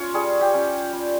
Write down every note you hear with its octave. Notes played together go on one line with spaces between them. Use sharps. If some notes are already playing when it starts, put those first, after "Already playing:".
Already playing: C#4 F4 C#5
G3 G#4
G4
C#4 F4
G3